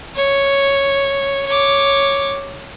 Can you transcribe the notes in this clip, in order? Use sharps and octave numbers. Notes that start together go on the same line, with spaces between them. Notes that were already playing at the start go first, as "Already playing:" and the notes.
C#5
C#5 D6